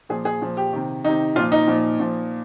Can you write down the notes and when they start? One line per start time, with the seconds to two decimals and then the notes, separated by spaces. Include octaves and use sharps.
0.09 A#2 F3 G#4
0.25 G#4
0.41 A#2 F3
0.57 G4
0.73 C3 D#3
1.04 C3 D#3 D#4
1.36 A#2 F3 F4
1.52 D#4
1.68 A#2 F3
1.99 A#2 F3